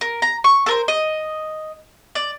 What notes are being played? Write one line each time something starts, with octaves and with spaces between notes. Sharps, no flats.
A#4
A#5
C#6
A4 A#4 C5
D#5
D5